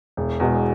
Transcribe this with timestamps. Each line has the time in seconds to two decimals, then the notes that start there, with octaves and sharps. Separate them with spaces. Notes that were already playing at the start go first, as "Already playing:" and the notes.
0.17 E1
0.40 E2 B2 G#3